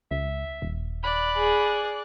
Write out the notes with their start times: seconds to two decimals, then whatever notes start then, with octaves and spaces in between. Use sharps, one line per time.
0.11 C#2 E5
0.62 D#1
1.04 D5 B5 F#6
1.36 G#4